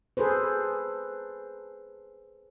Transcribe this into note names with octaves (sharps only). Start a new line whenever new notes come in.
G#4 A4 B4 C5